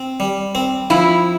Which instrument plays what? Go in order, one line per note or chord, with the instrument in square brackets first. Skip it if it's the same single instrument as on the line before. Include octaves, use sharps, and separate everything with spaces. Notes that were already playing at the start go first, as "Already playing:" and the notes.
Already playing: [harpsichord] C4
G3
C4
[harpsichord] F3 [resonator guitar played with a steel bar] E4